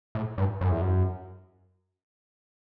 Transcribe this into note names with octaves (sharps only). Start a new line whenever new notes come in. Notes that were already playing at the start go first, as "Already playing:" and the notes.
A2
G2
F#2
E2
F#2